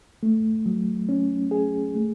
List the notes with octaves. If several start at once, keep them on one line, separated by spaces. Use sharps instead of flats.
A3
F#3
C#4
G#4
A3